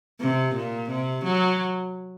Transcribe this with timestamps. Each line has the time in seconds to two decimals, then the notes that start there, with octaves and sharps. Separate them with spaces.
0.20 C3
0.55 A#2
0.90 C3
1.24 F#3